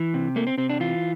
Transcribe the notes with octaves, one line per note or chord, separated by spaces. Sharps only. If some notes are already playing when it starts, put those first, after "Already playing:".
Already playing: E3
C3
A3 A#3
C4
C3 C4
D4
E3 F4